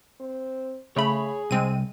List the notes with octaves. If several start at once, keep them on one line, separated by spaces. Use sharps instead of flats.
C4
C#3 A3 G#4 C#5 B5
C2 G#3 C4 D#7